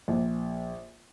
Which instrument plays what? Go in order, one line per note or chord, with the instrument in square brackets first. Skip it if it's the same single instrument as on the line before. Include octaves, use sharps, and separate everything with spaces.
[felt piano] A#1